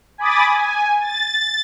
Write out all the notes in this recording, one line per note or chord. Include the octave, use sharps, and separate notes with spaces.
G#5 B5 D6 D#6 A6
G#5
A6